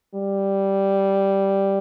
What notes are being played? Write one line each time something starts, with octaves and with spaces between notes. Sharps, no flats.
G3